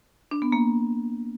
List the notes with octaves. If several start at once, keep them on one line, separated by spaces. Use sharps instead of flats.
D4
B3
A#3